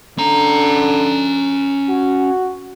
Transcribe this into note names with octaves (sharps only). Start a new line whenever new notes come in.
D3 C#4 A#5
F#4